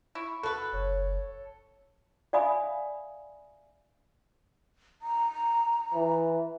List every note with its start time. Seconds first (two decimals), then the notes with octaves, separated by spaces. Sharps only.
0.15 E4 C#6
0.43 F#4 A4 B4
0.73 F#1 C#5
2.33 D5 E5 F5 G#5 B5 D#6
5.02 A#5
5.94 E3